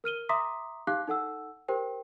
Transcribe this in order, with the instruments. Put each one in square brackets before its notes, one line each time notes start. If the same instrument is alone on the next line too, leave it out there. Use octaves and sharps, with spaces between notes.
[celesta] A#4 F6 D#7 G7
E5 A#5 C6 D6 D#6 B6
D#4 G4 F5 D6 F#6
D#4 A4 F#5 E6
G4 A#4 C5 G5